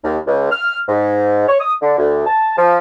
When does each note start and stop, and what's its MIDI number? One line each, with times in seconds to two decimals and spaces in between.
0.04 0.17 39
0.26 0.49 37
0.51 0.77 89
0.88 1.46 44
1.48 1.60 73
1.60 1.73 87
1.81 1.97 50
1.98 2.23 38
2.26 2.52 81
2.57 2.78 53